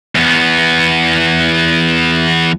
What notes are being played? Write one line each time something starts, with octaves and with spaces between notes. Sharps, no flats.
E2 B3